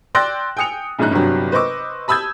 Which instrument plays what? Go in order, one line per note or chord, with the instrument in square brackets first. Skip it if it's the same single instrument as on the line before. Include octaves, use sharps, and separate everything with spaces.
[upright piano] D5 G5 C6 E6 F#6 A#6
G5 G#5 D#6 C#7 F7
A#1 G#2 C#3 D#4 F#6
G1 G2 C3 F#3
B4 C5 D#5 C#6 D6 E6
A5 B5 D#6 E6 G6 G#6